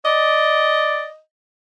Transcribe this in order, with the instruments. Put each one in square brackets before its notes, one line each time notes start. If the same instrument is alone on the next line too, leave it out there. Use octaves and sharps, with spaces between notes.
[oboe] D5 [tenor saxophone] D#5